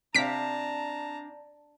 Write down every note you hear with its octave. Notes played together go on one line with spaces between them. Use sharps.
C3 D4 F5 A5 A#5 B6 D7